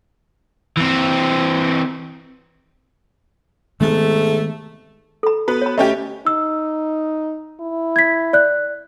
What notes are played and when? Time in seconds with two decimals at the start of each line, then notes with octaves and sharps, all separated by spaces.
0.77 E3 C4
3.81 G#2 C3 D#3 G#3 A3 B3
5.23 A4 B5
5.48 B3 F#4 B4
5.62 C#5 B5
5.78 A3 C#4 G4 D#5 B5
6.27 D#4 E6
7.60 E4
7.96 G#6 B6
8.33 D5 F#6